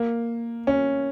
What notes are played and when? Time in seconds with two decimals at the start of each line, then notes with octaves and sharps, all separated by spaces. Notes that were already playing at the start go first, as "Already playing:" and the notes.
Already playing: A#3
0.67 C#4